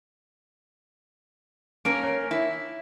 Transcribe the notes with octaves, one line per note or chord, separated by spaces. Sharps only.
A#3 C#4 A#4 D7
C#5
E4